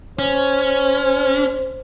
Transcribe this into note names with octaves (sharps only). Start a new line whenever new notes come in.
C#4 C5